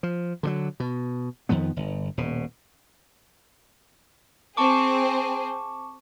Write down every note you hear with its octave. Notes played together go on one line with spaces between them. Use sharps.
F3
D3 D#3 F#3
B2
F2 D#3 F3 B3
G1
D#1 B2
C4 G#4 C5 A5 C#6 D6